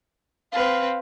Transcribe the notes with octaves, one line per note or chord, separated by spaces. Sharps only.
C4 B4 F5